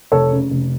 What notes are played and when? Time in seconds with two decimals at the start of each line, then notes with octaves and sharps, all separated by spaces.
0.12 F1 A4 C#5
0.31 C#3
0.50 F1